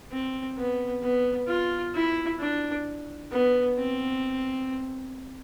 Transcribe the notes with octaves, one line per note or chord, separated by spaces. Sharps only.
C4
B3
B3
F4
E4
D4
B3
C4